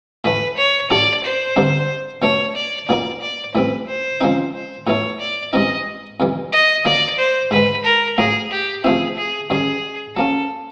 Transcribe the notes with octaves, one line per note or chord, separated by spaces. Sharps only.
A2 E3 A3 B4
C#5
A2 F#3 A3 D4 G4 D5
C5
G2 D3 G3 C4 D#4
B2 F#3 A3 D4 C#5
D5
A#2 F#3 B3 D#4 D5
D5
A2 E3 G3 C4 B4
C5
C#3 F3 G#3 C4 D#4
C5
A2 F#3 B3 E4 A4 C#5
D5
G2 E3 G#3 C4 D#4 D#5
F2 C3 E3 G3
D#5
D#3 F#3 A#3 D5
C5
G#2 D#3 G#3 B4
A#4
A2 F#3 A#3 G#4
G4
C3 F3 A3 C4 E4 G#4
G#4
F#2 D#3 G3 G#4
F#3 A#3 C#4 A4